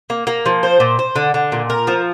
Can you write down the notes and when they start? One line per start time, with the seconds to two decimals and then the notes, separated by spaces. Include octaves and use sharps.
0.10 A#3
0.27 A#3
0.46 F3
0.63 C5
0.80 A#2
0.99 C5
1.16 D3
1.34 D3
1.52 A#2
1.70 A#4
1.87 F3